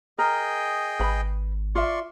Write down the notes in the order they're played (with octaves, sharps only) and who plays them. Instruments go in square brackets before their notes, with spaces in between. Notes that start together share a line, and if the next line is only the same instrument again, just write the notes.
[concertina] G#4 D#5 G5 [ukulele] A#4
[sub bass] G#1 [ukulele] B4 B5
[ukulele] F4 E5 [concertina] D5 C6 C#6